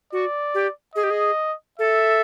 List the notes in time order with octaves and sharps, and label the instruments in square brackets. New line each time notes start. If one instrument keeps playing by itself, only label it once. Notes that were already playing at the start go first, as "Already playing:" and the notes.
[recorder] F#4 [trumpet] D5
[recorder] G4
[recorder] G#4 [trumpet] D#5
[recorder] G4
G#4
[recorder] A4 [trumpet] E5